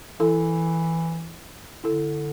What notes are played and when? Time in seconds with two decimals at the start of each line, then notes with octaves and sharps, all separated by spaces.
0.20 E3 E4 A4
1.84 D3 E4 A4